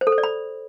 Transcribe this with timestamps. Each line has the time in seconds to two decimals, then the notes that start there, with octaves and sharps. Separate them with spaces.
0.01 C5
0.07 A4
0.12 C5
0.18 D5
0.23 B5